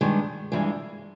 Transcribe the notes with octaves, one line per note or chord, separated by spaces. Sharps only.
G2 D#3 G#3
G2 E3 G#3